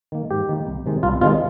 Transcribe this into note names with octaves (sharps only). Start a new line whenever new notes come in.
D#3 A#3
G#2 G4
D#3 A#3
C2
C3 D#3 G#3
C2 F4
C3 D#3 G#3 F4